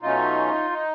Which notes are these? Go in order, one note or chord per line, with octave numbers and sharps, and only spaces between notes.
B2 F#3 A3 C#4 D#4 F4
D#4